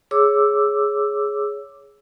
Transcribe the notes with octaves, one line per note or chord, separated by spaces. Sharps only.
G#4 C#5 D6 E6